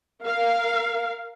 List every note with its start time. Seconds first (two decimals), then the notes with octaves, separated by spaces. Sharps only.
0.23 A#4 F5